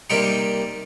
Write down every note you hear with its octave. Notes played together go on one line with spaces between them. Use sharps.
C3 G3 A#3 D#4 G4